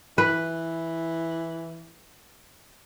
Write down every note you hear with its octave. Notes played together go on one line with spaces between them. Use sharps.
E3 B4